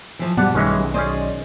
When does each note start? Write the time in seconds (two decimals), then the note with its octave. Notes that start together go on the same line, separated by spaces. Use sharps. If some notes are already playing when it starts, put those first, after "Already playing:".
0.19 E3 F3
0.37 G2 B2 G3 D5 F#5 A5
0.55 B1 D#3 E3 G#3 C#4
0.94 C#4 G#4 C5 D5 D#5